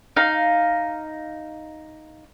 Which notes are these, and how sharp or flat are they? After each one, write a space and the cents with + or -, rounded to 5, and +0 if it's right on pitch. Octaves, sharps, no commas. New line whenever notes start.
D#4 +0 F5 +0